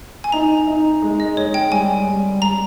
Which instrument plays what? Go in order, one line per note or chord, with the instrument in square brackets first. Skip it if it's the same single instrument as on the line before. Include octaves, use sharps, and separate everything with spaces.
[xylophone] G#5
[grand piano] D#4 [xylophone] A#5
[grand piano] D#4
G#3
[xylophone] D#5
[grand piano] G#3 [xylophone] C#5
[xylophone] G5
[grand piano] G3 [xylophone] G#5
[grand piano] G3
[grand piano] G3 [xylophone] A#5